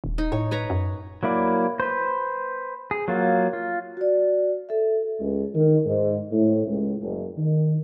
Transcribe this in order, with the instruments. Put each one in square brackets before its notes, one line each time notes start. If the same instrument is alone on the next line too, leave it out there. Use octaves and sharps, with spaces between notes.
[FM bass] D#1
[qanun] D#4
[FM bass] A2 [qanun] C#5
[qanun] B4 C#5 A#5
[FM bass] F#2
[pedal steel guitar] F#3 A#3 E4 D5
B4 C5
G#4
F#3 A#3 F4
F4
[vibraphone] F#4 D5
A4 E5
[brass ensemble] C#2
D#3
G#2
A2
C#2
F#1
D#3